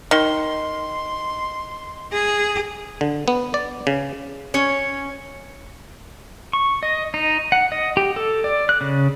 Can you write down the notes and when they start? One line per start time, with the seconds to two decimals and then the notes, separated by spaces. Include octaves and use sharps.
0.11 D#3 D#5 C6 G7
2.13 G#4
3.01 D3
3.28 B3
3.54 D5
3.87 C#3
4.54 C#4 C#5
6.53 C#6
6.83 D#5
7.14 D#4
7.52 F#5
7.72 D#5
7.97 G4
8.16 A4
8.44 D5
8.69 F#6
8.81 C#3